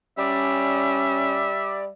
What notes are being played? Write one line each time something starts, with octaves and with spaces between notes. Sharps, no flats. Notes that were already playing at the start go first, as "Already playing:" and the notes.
G3 C#4 D5 E5